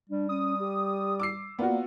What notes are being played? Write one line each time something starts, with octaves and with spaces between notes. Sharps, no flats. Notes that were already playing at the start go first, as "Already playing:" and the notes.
G3 D4
C#4 D#6
G4
D6 E6 C7
A#3 B3 F4 F#4 D5